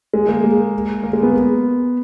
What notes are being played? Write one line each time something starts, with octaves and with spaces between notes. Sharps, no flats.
G#3
A#3
G#3
A#3
G#3
B3